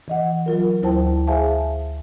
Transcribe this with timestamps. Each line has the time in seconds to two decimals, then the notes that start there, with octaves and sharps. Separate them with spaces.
0.08 E3 D#5 F#5
0.46 F#3 F4 A#4
0.83 D2 F#3 E4 C5 G5 A5
1.27 G#4 C5 E5 F5 G#5 A5